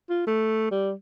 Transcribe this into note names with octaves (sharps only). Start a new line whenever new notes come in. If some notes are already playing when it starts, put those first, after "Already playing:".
F4
A3
G3